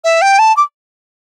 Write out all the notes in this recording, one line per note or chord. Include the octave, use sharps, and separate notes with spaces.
E5
G5
A5
D6